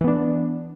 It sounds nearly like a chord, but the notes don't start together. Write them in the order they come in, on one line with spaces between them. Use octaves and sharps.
E3 B3 D4